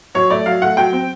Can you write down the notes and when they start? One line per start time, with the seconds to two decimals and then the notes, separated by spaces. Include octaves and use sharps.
0.15 F#3 C#5
0.30 A3 D5
0.46 F#3 F5
0.62 A3 F#5
0.77 F#3 G5
0.93 C4